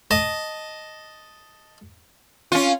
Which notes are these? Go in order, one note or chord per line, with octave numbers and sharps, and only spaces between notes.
D#5 A5
C#4 F4